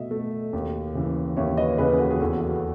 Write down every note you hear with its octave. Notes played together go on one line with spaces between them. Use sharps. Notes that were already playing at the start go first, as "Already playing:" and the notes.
Already playing: B2 A3 D#5 E5
A3
D#2
C#3 E3
D#2 C#5 E5
B4 D#5
C#3 E3 G#4 B4
G#4
F#4 A4
G#4
E2 F#4 A4
F#4
F#4